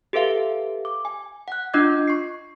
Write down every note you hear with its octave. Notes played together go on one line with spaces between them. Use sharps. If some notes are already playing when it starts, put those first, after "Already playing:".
G4 A4 B4 E5 F5
D6
G#5
F#5 F#6
D4 F4 D#5 D6 G6 G#6
C#6 C7